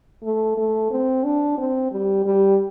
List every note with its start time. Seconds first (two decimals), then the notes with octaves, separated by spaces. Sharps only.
0.23 A3
0.57 A3
0.91 C4
1.24 D4
1.58 C4
1.92 G3
2.25 G3